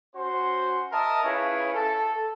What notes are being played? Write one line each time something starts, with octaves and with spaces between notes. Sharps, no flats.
C#4 F#4 C5 C6
A#4 D#5 E5 A5
C#4 E4 F4 G#4 B4 C#5
A4